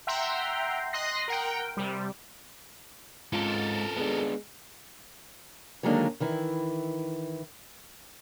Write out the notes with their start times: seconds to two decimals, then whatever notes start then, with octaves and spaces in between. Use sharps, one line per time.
0.07 E5 F#5 G5 A#5 C6
0.93 D#5 C6 D#6 F#6 A#6 C7
1.28 A#4 F#5 G5
1.77 C3 G3
3.33 G#2 C4 C#4 F4 A4 A#4
3.97 G#3 B3 D4
5.83 D3 D#3 F#3 G#3 A#3 D4
6.20 D#3 E3 E4